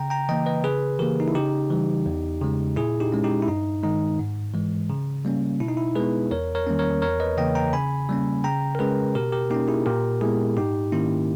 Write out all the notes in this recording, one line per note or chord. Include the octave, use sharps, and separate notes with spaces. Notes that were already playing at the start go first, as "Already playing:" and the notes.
Already playing: C#3 G5 A#5
G5 A#5
E3 A#3 D#5 G5
B4 D#5
C#3 G#4 B4
E3 A#3 G4 A#4
D#4
E4
C#3 D#4 G4
E3 G3
E2
C#3 G#3
A#2 E4 G#4
D#4 G4
G#3 C#4
D#4 G4
E4
G2 D#4
D#3 G#3 D#4
G#2
E3 G#3
C#3
G3 A#3 C#4
B2 E4
D#4
E4
G#3 B3 G#4 B4
E2 A#4 C#5
A#4 C#5
D#3 G3 A#3 C#4
A#4 C#5
E2 A#4 C#5
B4 D#5
C#3 E3 A#3 D#5 G5
G5 A#5
C#3 G#5 B5
G3 A#3 C#4
C#3 G5 A#5
A#4
G#3 C#4 G#4 B4
B2 G4 A#4
G4 A#4
A#3 C#4 D#4 G4
E4 G#4
A#2 G4 A#4
G#3 B3 E4 G#4
G#2 D#4 G4
D#3 A#3 C#4 E4